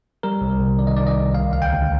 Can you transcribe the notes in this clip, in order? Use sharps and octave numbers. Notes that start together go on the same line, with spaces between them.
G3 A#4
C2
C3
D#3 D5
D#5
D#3 D5
D#5
C2
D2 F5
D2 F5
G5
D2